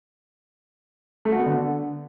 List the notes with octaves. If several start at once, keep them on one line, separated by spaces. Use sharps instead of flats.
A3
F#4
B3
D3